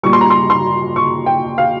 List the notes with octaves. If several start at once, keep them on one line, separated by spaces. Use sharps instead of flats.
A#2 G3 C#6
C6
A#5
C6
C6
C#6
G5
F5